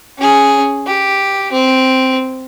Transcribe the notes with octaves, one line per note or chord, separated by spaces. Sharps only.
C#4 G#4
G4
C4